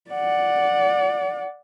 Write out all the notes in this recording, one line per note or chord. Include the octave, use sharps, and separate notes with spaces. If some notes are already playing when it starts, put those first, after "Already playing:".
D5 F#5